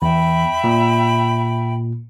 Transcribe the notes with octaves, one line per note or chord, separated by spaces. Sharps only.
E2 E5 G5 B5
A#2